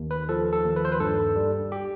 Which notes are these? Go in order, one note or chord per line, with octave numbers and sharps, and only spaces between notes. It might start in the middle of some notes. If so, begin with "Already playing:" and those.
Already playing: D#2
B4
F3 A4
A4
D#2
B4
C5
B4
G2 A4
G3
G4